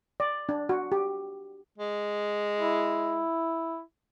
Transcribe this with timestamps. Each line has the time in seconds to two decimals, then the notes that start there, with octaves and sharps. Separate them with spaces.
0.20 D5
0.49 D4
0.69 F#4
0.92 G4
1.78 G#3
2.60 E4